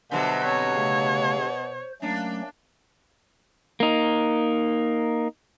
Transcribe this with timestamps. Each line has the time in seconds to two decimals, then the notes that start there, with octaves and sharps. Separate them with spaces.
0.11 B2 D3 F#3 G3 C5 E5 C6
0.43 C4 C#5
0.75 C#3 A3 F5
1.41 C5
2.02 F#3 A3 A#3 C#4 D4
3.80 A#3 D#4